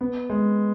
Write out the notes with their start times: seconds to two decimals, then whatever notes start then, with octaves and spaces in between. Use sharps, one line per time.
0.01 B3
0.30 G#3